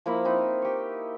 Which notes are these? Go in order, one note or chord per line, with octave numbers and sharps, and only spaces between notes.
F3 A#3 E4 B5
C4 D#4 E4
G4 C#6